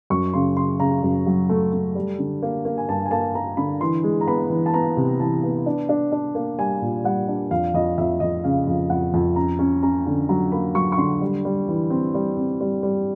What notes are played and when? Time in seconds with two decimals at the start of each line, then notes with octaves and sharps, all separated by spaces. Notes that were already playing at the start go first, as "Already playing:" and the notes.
0.10 F#2 C#6
0.33 C#3 C6
0.56 C#3 C6
0.79 C#3 A#5
1.03 F#2
1.27 F#3
1.49 A3
1.73 A3
1.95 G3
2.19 D3
2.43 A#3
2.65 A#3
2.78 G#5
2.88 G2 A5
3.06 G#5
3.11 A#3 A5
3.35 A#3 A#5
3.57 D3 B5
3.81 E3 C6
4.03 G#3
4.21 A#5
4.27 B3 B5
4.50 E3
4.66 A5
4.74 B3 A#5
4.97 C3
5.20 E3 A5
5.43 B3
5.66 D4
5.89 D4
6.12 D4
6.35 A#3
6.58 G3 G#5
6.82 A#2
7.04 G3 F#5
7.28 D4
7.51 F2 F5
7.74 F2 D#5
7.98 F2 E5
8.20 F2 D#5
8.44 C#3 F5
8.68 F2
8.90 F2 F#5
9.14 F2
9.36 C#4 A#5
9.59 C#4
9.83 C#4 A#5
10.06 D3
10.29 F#3 A#5
10.52 A#3 B5
10.75 F#3 C#6
10.92 C#6
10.98 D3 C6
11.21 G3
11.45 G3
11.68 E3
11.90 C4
12.14 G3
12.37 C4
12.61 G3
12.83 G3